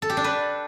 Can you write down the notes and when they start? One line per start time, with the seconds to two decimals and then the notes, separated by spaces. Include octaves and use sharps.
0.02 A4
0.10 G4
0.17 D4
0.24 B4